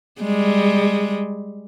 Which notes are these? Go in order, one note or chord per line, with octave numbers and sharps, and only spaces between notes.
G3 G#3